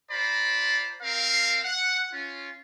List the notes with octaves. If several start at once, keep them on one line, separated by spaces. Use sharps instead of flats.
F4 C5 D5 A#5 B5
C4 A#4 F5
F#5
C#4 F4